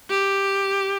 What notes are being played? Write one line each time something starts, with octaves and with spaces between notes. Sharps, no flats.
G4